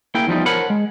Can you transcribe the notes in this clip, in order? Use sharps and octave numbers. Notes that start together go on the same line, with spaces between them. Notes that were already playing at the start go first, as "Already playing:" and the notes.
A#3 E4 G#4 G5
E2 F3 G3 D#4
A#4 C5 C#5 F#5 A5 B5
G#3